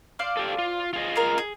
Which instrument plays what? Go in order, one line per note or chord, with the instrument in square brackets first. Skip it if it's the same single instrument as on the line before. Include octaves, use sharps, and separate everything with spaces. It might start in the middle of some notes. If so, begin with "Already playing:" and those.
[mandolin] C5 D5 F5
[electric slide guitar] G4 A4
F4
F4 G#4 D#5
[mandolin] A#4 F5
G#4